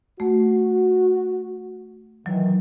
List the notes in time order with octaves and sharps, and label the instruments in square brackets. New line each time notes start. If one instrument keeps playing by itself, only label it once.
[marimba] A3 [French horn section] F#4
[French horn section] D#3 E3 [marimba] F#3